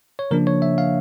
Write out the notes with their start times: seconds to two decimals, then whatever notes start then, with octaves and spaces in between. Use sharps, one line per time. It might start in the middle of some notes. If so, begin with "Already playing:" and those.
0.19 C#5
0.31 C#3 F3 A#3 D4 A#4
0.47 C#5
0.62 E5
0.78 F5